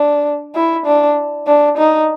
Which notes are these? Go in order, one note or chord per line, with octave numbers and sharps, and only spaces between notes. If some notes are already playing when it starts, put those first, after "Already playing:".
Already playing: D4
E4
D4
D4
D#4